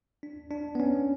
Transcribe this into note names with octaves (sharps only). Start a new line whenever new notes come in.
D4
D4
B3
C#4